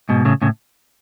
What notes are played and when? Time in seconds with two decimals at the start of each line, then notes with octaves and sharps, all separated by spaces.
0.09 G#2 B2
0.25 A2 C#3
0.42 A2 C#3